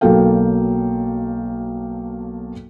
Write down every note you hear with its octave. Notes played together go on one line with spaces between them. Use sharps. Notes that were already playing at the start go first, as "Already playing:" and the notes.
B1 F#3 A#3 A4 F5 G5